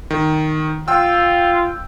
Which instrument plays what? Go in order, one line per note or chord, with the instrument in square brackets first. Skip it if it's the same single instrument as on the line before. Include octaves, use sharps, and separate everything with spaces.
[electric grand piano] D#3
[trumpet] F4 [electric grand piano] G5 E6